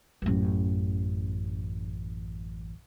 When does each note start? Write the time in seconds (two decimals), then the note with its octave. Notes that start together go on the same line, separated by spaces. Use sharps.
0.22 A1 F#2